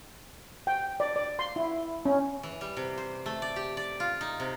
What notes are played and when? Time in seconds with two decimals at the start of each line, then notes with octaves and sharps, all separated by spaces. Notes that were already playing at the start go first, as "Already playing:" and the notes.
0.67 G5
1.00 D5
1.16 D5
1.39 C6
1.56 E4
2.05 C#4
2.43 E3
2.61 G3
2.77 C3
2.98 C5
3.26 A3
3.42 D5
3.56 G4
3.77 D5
4.00 F4
4.21 D#4
4.40 C3